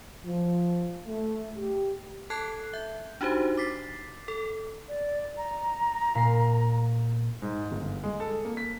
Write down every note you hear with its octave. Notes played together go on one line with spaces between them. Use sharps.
F3
A3
G4
A4 A5 F#6 G#6 C7
E5 G6
D4 D#4 F#4 G4 C5
D6 A6 B6 C7
A4
D5
A#5
A#2 C7
G#2
G1
G#3
A4
A#3
B6